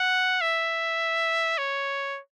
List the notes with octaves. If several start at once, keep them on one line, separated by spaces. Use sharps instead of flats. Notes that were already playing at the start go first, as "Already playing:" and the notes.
Already playing: F#5
E5
C#5